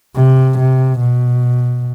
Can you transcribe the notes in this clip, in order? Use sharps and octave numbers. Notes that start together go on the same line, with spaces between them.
C3
C3
B2